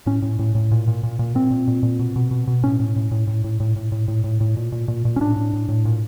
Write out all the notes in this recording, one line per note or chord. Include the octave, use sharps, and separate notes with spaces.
A2 C#4
A2
A2
A2
A#2
A#2
A#2
A#2
A#2 C4
A#2
A#2
A#2
B2
B2
B2
B2
A2 C#4
A2
A2
A2
A2
A2
A2
A2
A2
A2
A2
A2
A#2
A#2
A#2
A#2
C#4
A2 D4
A2
A2
A2
A#2